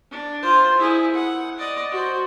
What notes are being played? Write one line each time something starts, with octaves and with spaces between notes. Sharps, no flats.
D4
F4 C5
E4 G#4
F#5
D5 D#5
F#4 C5